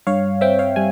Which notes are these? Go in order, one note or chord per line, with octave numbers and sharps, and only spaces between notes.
G2 C#5 F5
C4 E5 G5
C#5 F5
G3 G#5